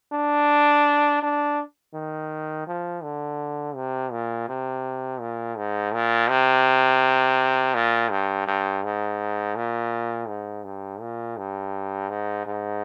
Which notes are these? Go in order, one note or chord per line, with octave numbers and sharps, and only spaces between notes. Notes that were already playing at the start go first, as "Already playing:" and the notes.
D4
D4
D#3
F3
D3
C3
A#2
C3
A#2
G#2
A#2
C3
A#2
G2
G2
G#2
A#2
G#2
G2
A#2
G2
G#2
G#2